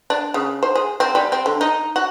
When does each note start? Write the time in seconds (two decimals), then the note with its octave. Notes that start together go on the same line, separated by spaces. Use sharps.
0.10 D4
0.34 C#3
0.63 C5
0.75 G#4
1.00 C4
1.15 G3
1.32 C4
1.46 D3
1.61 D#4
1.96 F#4